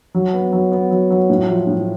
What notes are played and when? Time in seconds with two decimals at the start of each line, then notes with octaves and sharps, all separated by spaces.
0.14 F#3
0.33 B3
0.52 F#3
0.72 B3
0.91 F#3
1.10 F#3
1.30 A2
1.48 F3
1.67 A2